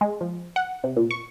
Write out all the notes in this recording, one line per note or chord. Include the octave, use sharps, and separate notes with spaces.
G#3
F3
F#5
C3
A#2
C#6